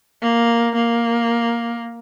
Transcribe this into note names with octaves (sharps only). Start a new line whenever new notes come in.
A#3
A#3